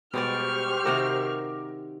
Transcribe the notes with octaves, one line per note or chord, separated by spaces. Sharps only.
B2 G3 G#3 G4 C5 D5 C#6 F6
C3 D#3 F#4 A#4 D6 E7